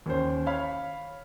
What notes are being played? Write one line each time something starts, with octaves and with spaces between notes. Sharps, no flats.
D#2 C#4 C5
C#5 F5 B5 F6